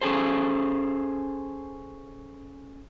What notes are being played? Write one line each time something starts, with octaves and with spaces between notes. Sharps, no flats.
C#4 G#4 A4 C5